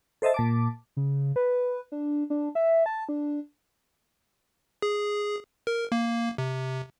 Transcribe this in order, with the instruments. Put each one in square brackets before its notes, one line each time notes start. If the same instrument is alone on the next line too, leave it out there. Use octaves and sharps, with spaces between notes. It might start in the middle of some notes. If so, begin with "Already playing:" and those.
[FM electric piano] A4 C5 D#5 E5 A5
A#2 A5 D6
[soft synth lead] C#3
B4
D4
D4
E5
A5
D4
[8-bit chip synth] G#4
A#4
A#3
C3